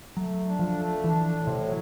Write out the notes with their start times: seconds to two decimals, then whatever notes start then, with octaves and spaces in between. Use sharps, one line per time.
0.16 F#3 A3
0.46 D4
0.59 F3
0.74 A3
1.03 E3 D4
1.33 A2
1.47 C3
1.61 F#3